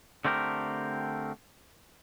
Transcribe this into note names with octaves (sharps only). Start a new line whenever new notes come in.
D3 A3 C4 G4 A#4